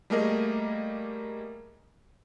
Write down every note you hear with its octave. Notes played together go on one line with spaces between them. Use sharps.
G3 A3 A#3 G#4 A#4 D#5